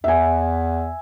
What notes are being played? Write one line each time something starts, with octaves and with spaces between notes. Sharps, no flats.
E2 E5 G#5